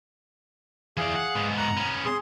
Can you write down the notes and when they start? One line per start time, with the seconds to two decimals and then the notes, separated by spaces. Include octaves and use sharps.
0.97 E3 G#4 D5 F5
1.16 F#5
1.35 G#2 B3
1.57 F#5 A#5
1.77 B3 C#4
2.05 G#4 C6